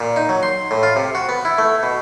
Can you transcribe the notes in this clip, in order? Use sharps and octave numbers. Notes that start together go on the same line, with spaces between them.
A#2
D#4
F#3
C6
A2
F4
C3
F#4
B3
E4
A3
B2